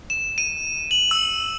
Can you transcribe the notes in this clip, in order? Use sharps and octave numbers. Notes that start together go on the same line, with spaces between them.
E7
D#7
F#7
E6